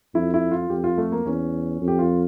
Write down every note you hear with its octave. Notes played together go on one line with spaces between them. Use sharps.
F2 E4
E4
F4
F2 G4
F4
A3
A#3
E2 C#4
F2
G4
F4